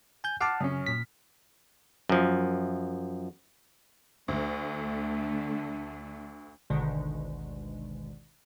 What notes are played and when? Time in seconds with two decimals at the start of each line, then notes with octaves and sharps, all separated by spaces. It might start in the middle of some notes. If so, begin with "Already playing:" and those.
0.24 G#5 G6
0.41 F#5 A5 D6 F6 C7
0.61 F#2 C#3 C#4
0.86 A#2 B6
2.09 F#2 F3
4.28 D2 D3 A3
6.70 G#1 D2 B2 D3 D#3 G#3